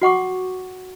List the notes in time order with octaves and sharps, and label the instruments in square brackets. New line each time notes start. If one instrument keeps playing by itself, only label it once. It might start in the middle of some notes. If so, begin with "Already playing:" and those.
[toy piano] F#4 F#5 C#6 D6